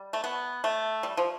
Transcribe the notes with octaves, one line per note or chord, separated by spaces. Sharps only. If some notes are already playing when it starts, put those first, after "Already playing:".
Already playing: G3
A3
B3
A3
G3
F3